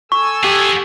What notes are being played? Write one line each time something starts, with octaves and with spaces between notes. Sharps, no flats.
A4 G#5 C#6 E6
B3 G4 G#4